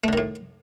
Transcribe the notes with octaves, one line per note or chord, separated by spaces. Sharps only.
A2 D3 D#3 A3